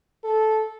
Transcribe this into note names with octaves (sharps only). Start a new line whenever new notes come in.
A4